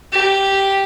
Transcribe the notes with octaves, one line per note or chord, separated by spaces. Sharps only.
G4